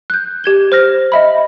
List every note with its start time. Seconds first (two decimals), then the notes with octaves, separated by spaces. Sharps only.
0.10 F#6 G6
0.44 G4 G#6 G7
0.72 C5 F6 A#6
1.12 D#5 E5 B5